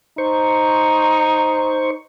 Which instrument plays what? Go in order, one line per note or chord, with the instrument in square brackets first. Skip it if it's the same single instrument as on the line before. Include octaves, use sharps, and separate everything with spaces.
[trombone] D#4 [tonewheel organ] C5 C#6